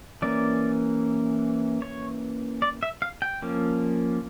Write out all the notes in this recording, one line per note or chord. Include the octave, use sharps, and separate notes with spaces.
E3 A#3 C#4 D5
C#5
D5
E5
F5
G5
F3 A#3 C#4